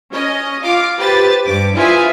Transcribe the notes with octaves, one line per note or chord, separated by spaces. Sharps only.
C#4 D#5
F4 F5 D6
G4 B4 C5 A6
G2 D6
E4 F4 G#4 B4 C5 G#5